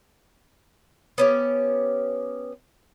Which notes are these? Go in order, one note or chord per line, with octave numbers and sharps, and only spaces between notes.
B3 C#4 G4